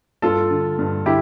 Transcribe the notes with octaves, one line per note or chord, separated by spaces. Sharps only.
G2 F4 A4
D3
G2
D3 E4 G4